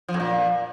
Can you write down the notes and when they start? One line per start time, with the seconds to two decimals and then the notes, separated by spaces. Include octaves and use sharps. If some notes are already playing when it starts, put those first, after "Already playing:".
0.08 F3
0.14 F2
0.20 A#2